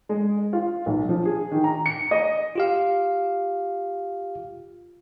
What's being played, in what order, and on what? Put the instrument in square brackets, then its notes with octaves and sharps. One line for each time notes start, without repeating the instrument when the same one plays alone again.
[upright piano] G#3
F4
B1
F3
G#4
D#3
A#5
C#7
D#5
[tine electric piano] F4 G4 F5